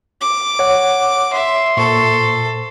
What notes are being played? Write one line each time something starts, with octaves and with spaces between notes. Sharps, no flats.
D6
C#5 F#5
E5 C6
A#2 A4 C5 C#6